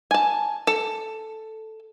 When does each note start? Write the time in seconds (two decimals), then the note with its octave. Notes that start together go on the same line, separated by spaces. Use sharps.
0.11 G#5 A5
0.67 A4